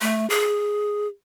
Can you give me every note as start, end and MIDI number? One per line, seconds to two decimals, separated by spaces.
0.01 0.28 57
0.30 1.07 68